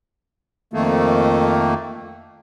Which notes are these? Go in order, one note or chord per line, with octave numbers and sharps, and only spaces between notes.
F2 D#3 A3 A#3